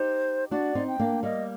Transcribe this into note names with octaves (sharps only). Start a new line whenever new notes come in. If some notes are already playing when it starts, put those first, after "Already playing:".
Already playing: D#4 G4 C5
D4 F#4 D5
C4 D#4
G5
A#3 D4
G3 A#3 D#5